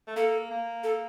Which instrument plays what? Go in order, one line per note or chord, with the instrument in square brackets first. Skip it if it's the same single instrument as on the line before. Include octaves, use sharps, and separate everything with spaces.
[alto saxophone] A3
[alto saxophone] A#3 [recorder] A4
[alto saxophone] A#3
[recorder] A4